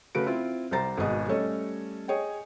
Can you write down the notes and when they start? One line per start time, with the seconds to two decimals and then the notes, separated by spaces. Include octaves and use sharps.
0.15 C#3 A3 F#4 B4 D7
0.26 C4 E4 F4
0.71 C2 G3 G4 C5 A#5 A6
0.98 G#1 B2 G#3 G#4 D#5
1.28 G3 A3 C#4 A4 C#5 D#5
2.08 G#4 C#5 D#5 G5